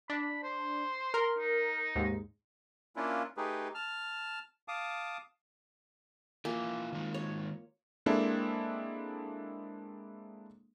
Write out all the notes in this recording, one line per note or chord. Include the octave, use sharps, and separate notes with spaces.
D4 B5
C5
A#4 C6
D#4
D#2 G#2
A#3 C#4 D4 E4 F4
A3 D#4 G4 G#4 B4
A5 F6
F5 A5 D6 D#6
A#3 E4 F4 G5 G#5
D#3 G#3 D#4
C#5
G#3 A#3 C4 D4 E4 A4